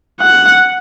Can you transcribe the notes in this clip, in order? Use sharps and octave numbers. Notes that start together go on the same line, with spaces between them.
F#5